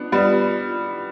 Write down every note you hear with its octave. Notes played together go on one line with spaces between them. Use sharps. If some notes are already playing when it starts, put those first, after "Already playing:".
Already playing: B3 D4
G3 B3